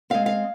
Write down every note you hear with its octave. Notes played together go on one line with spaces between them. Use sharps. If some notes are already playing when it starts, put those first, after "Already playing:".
G#3 C4 F5
F5